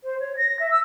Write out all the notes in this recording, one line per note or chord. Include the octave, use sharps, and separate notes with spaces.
C5
C#5
A#6
E5
E6